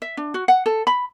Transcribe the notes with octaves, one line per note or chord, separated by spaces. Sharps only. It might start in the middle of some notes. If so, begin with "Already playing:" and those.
E5
D4
F#4
F#5
A4
B5